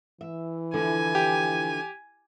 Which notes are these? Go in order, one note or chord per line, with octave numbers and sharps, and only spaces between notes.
E3 E5
D3 F3 E4 G#5
G4